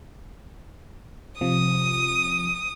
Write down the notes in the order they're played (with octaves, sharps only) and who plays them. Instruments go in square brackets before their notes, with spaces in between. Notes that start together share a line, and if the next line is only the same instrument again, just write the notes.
[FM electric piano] C3 F3 [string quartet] D#6